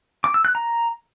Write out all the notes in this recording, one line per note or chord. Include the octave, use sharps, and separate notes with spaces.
D6
E6
F#6
A#5